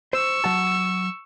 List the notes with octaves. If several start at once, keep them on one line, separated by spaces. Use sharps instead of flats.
C5 C#6 E6
F#3 F#5 A5